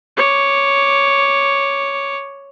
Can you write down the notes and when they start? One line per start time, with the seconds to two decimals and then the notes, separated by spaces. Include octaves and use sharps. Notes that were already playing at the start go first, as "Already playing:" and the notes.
0.17 C#5 D6